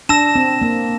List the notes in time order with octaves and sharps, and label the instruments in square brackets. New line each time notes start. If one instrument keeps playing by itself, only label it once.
[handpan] D4 [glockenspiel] A5 E6 A#6 E7
[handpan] C4
A#3